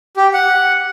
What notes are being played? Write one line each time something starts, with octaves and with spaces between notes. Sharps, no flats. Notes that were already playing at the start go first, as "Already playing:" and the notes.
G4
F#5